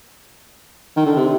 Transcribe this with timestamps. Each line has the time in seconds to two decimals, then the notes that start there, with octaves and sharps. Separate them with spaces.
0.96 D#3
1.06 D3
1.16 C3